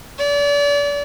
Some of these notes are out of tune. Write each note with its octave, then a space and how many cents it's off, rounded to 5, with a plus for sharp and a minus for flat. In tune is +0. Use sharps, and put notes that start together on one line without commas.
D5 -35